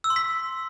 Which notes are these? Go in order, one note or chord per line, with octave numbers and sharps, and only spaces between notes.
E6
C6
B6